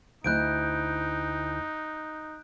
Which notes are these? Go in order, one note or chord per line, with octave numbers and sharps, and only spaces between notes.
D2 D#4 E4 D#5 F#6 G6 D7